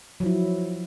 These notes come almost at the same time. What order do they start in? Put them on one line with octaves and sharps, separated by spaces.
F#3 F3 E4